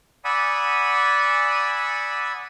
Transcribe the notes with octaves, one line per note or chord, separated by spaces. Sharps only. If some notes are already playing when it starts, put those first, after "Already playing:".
D5 F#5 G#5 B5 D#6 E6